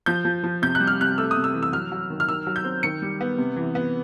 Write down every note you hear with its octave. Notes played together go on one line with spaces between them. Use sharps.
F3 G6
F3
F3
C3 G6
F#6
G3
F6
C3 F#6
A3 E6
D#6
C3
E6
E3
E6
F#3 F6
F#3
D#3
F6
D#3 E6
F#3
G6
C4
D#3 C#7
G3
B3
C3
E3
B3